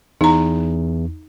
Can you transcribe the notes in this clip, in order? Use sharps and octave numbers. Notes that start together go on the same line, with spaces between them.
E2 D#4 A#5